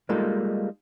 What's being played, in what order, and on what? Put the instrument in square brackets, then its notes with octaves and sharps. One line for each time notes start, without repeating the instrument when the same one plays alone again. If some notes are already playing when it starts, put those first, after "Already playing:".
[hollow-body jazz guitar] G3 G#3 A#3 D#4 F4 A4